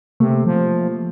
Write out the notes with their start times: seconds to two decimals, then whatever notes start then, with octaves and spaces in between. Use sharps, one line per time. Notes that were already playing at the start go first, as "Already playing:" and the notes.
0.20 C3 A3 A#3
0.46 F3